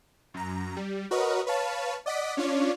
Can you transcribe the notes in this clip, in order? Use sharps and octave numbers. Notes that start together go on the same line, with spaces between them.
F#2 A#5
G3
F#4 A#4 B4 C#5 D#5
B4 C#5 F5 A5
D5 D#5 F#5 D6 B6 D7
C#4 D4 F4 C#5 D5